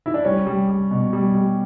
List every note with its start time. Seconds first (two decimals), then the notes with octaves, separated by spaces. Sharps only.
0.06 E4
0.14 D4
0.24 G3 C#4
0.47 G3
0.68 G3
0.91 B2
1.13 G3
1.35 G3